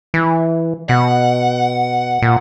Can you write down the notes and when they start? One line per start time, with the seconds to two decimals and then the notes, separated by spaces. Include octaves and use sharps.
0.14 E3
0.89 B2 F#5
2.22 A#2